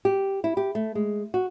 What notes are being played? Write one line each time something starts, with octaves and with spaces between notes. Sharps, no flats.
G4
E4
G4
A3
G#3
F#4